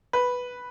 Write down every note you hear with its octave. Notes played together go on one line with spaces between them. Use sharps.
B4